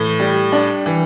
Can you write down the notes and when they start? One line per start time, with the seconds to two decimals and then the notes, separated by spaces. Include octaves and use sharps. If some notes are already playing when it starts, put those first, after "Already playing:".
Already playing: A2 E3
0.20 G3
0.52 D4
0.86 E3